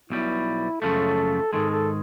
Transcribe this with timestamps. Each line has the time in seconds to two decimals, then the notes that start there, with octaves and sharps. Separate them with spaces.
0.10 B1 B2 G3 E4
0.81 F#2 C#3 F3 A3 A4
1.53 G#2 D#3 G#3 A4
1.71 A4